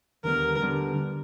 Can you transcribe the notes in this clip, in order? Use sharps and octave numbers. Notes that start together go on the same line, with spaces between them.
D#2 D3 G3 B3 A#4
D3 G3 B3